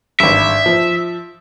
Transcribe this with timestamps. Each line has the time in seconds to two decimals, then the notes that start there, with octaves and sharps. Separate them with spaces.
0.20 G#1 G2 E5
0.66 F3